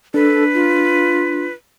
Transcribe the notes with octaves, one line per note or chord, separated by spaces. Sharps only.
D4 A4 B4
F4